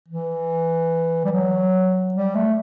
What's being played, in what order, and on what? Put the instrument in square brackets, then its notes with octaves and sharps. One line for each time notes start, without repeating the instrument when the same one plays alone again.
[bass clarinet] E3
G3
F#3
G3
A3